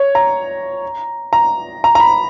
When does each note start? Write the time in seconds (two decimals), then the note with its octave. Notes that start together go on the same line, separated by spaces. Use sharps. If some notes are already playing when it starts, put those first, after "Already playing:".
Already playing: C#5
0.15 A#5
1.33 A#5
1.84 A#5
1.95 A#5
2.00 B5